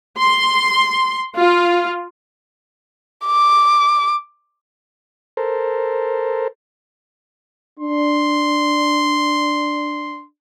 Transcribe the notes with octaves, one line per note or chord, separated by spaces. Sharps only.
C6
F4
D6
A4 A#4 C5
D4 C6